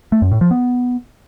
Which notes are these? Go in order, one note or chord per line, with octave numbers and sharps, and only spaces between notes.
A3
F#2
A2
F3
B3